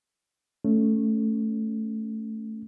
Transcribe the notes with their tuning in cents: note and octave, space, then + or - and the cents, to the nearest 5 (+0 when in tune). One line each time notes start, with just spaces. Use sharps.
A3 +0 C#4 +10